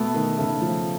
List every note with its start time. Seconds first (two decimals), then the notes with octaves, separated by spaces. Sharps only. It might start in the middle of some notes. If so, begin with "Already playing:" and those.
Already playing: B2 A3 B3
0.14 D#3
0.38 C#3 A3
0.61 F3